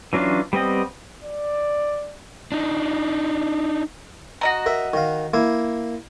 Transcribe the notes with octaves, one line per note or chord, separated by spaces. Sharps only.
E3 F#3 C#4 D4 F4
G3 B3 C4 D#5
D5
D4 D#4
F#4 D#5 A#5
A#4 E5
D#3 F5
A#3 E4